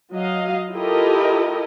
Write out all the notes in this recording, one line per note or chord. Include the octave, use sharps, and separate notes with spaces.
F#3 D#5 F5
E4 F4 G4 A4 A#4 D#5